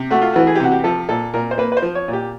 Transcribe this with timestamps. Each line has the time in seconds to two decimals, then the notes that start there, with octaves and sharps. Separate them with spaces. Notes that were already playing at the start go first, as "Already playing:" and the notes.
Already playing: C3
0.10 A3 F#4
0.22 F4
0.33 E3 F#4
0.47 G#4
0.55 G4
0.60 C3 F#4
0.72 G4
0.84 F3 A4
1.09 A#2 A4
1.34 A#2 A#4
1.51 C5
1.58 A#3 B4
1.72 B4
1.77 C5
1.82 F3
1.95 C#5
2.08 A#2
2.13 G4